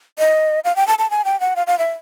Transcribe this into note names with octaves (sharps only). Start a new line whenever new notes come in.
D#5
F5
G5
A5
A5
G#5
G5
F#5
F5
F5
E5